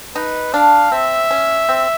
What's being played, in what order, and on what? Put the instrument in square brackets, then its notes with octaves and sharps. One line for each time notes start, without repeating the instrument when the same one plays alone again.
[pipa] D#4 [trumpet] B4
[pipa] D4 [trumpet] F5
[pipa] C4 [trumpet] E5
[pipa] C#4
C4